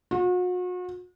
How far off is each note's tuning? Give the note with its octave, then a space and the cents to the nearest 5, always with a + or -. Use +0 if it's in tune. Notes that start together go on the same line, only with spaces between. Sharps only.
F#4 -40